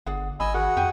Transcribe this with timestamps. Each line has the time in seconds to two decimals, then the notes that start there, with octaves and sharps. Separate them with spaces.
0.06 G1 D4 G#4 F#5
0.40 G#1 D#5 G#5 B5 E6
0.54 F#4 G#4 A#4 F#5
0.77 F2 G4 G5 G#5